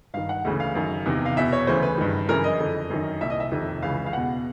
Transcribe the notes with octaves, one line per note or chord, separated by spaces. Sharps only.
G2 D#3 F5
F#5
D2 C#3 E3
F5
F#2 D#3
E2 C3 D#3
F5
E2 B2 E5
C#5
D2 C#3 E3 C5
B4
G2 D#3
F#2 C#3 E3 A#4
D#5
F2 D3
F#2 D#3
C2 A#2 E5
D#5
E5
F2 C3 D#3
C#2 C#3 E3 F5
F5
E2 B2 F#5